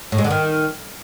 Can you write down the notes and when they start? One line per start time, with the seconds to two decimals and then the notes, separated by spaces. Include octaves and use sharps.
0.12 A2
0.18 G#3
0.24 D3
0.30 D#3